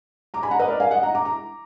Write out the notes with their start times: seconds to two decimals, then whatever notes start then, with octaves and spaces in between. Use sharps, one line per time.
0.34 A#5 D6
0.43 G#5 B5
0.51 F#5 A#5
0.59 B4 D#5
0.68 A#4 D5
0.80 F5 G#5
0.91 D#5 F#5
1.03 F#5 A#5
1.15 A#5 D6
1.25 A#5 D6